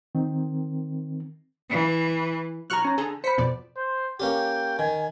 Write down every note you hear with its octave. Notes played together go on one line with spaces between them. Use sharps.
D#3 C4
E3
B1 F#4 A#5 C#6 F6 F#6
C#4 A#5
D3 G#4 A4 A#5
C5 B5 B6 C#7
F2 B2 D5
C5
A#3 C#4 G4 G5
D#3 G#5